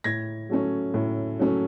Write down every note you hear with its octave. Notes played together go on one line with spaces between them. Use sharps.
A2 G#6 A#6
F#3 A3 C#4
A2
F#3 A3 C#4